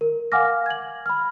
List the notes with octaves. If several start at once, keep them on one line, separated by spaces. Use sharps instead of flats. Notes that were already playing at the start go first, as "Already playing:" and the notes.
A#4
F5 F#5 G#5 D6 F6 A#6
G#6 F#7
B5 F6